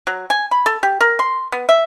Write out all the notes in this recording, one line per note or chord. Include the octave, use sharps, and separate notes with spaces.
F#3
G#5
B5
A4
G4
A#4
C6
B3
E5